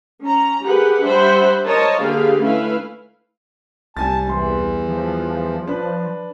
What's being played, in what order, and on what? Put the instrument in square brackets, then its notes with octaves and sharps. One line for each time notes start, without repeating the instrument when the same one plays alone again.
[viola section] C#4 A#5
G4 G#4 A#4 B4 F#5
G3 D4 C5 E5 F#5 B5
A#4 C5 C#5 D#5 A5
D3 A#3 G4 G#4 B4 F5
A3 C#4 E4 B4 F5
[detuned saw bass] C2 [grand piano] G3 G#5 A6 [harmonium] A5
[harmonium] E2 E3 [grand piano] G3 C6
[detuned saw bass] F3
[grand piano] D4 B4